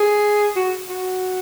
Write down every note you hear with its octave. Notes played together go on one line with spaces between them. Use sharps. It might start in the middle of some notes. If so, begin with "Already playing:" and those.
Already playing: G#4
F#4
F#4